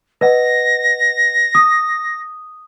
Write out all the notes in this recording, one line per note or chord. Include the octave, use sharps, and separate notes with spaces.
B4 D#5 F#5 A#6
D#6